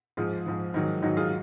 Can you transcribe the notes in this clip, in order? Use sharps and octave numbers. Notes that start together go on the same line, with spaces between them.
G#2 F3 F4 G#4
G#2 F3
G#2 D#3 F#3
G#2 D#3 F#3 D#4 F#4
F4 G#4